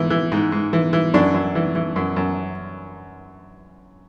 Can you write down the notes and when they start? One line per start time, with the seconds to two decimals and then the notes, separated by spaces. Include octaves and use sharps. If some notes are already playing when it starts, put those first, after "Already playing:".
Already playing: G#2 E3
0.10 E3
0.32 G#2
0.52 G#2
0.73 E3
0.93 E3
1.14 F#2 D4
1.34 F#2
1.55 E3
1.75 E3
1.96 F#2
2.16 F#2